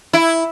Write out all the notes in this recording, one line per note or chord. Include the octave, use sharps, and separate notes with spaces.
E4